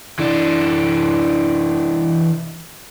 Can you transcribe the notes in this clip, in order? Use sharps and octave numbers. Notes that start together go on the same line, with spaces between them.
E3 D4